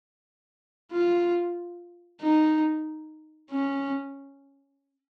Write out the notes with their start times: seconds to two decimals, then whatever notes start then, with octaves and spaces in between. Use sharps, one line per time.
0.92 F4
2.21 D#4
3.51 C#4